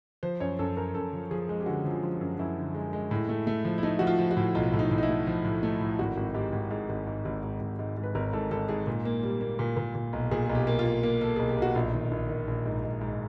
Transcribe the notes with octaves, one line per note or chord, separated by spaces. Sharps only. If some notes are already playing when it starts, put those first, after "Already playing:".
F3 C5
F#2 C#5
F#2 A4
F#2 A#4
F#2 A4
F3
F3 G#4
G#3
G4
D3 F#4
F3
F4
F3
F4
F#2
F#2 E4
D3
G#3
G#3
A2
A3
A3
F3
E4
A3 D#4
F3 F#4
F4
F3
F#4
A2
B1 F4
A2
D#4
A2
D#4
E4
A3
F3
A2
A3
A2
G#1 F#4
G#1
G#2 G4
G#1
G#2 G#4
G#1
G#2
G#1
G#2
G#1
G#2
G#2
B4
G#1 A#4
G#2 A4
G#1 A4
G#2 G#4
A#2
A#3
G3
A#3
A#2
A#2
A#2
B1
A#2 G#4
B1 G#4
G4
A#3
F4
A#3
A#3
A#3 A4
B1 G#4
G4
B1
F#4
A#1 F4
D#3
A#1
D#3
A#1
G#2
G#2
G#2